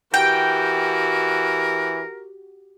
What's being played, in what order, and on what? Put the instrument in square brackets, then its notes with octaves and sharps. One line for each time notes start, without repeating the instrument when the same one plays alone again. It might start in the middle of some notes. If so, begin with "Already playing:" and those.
[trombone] E3 [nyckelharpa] F#4 G4 [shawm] A#4 [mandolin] G5